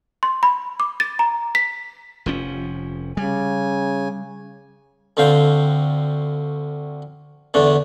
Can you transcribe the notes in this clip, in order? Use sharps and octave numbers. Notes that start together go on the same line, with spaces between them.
C6
B5
D6
A6
A#5
B6
F1 F3 C#4
C#3 G3 G#5
D2 D3 C4 F5 G5
E2 D3 A3 D4